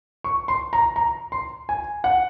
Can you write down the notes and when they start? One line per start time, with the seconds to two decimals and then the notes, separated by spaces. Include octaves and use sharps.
0.24 C#6
0.48 C6
0.73 A#5
0.96 A#5
1.32 C6
1.69 G#5
2.04 F#5